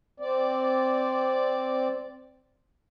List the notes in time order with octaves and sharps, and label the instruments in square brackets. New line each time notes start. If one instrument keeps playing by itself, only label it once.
[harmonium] C4 D5